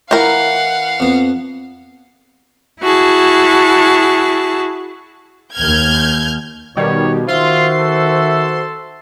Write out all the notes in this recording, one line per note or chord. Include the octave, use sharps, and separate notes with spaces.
E3 A#4 F5 F#5
F2 B3
E4 F#4 G#4 A5
D#2 F6 G6 G#6
B2 D#3 G3 C#5
D#3 F4 F#4 C5 E5 C6
A4